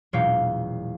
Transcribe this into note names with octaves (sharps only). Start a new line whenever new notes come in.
E1 A#2 F#3 C#5 F5 G5